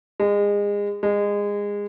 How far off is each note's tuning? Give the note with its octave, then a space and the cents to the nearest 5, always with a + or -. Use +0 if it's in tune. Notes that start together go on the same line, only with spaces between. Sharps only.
G#3 -30
G#3 -25